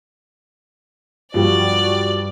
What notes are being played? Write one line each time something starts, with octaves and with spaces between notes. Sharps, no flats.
G2 F3 G3 F#4 D5